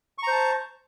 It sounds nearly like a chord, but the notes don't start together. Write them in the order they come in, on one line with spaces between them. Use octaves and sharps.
C#6 A#5 C5 A5